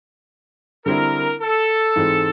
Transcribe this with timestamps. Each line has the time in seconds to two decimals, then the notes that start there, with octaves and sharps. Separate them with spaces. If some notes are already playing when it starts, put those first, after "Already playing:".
0.85 D3 G3 C4 E4 A#4
1.41 A4
1.96 G#2 E3 G#3 C4